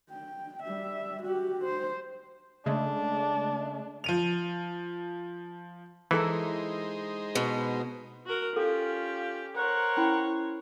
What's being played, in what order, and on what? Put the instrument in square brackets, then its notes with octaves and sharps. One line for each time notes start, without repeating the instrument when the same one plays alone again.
[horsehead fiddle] G5
G3 E5
F#4 G4
C5
[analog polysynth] C#3 G#3 A3 [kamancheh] D4
[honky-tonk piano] F3 D#7 F7
[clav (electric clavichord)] E3 [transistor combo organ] G#3 D#4 C5 [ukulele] E4 A4 A#4
[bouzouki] B2
[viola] F#4 A#4
[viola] C#4 G4 [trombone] F4 [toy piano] A4
[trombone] A#4 [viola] C5 C#5 [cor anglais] F#5
[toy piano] C#4 E4 B5